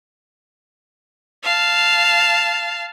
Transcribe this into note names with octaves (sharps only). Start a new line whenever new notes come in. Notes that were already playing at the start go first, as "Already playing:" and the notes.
F5 A5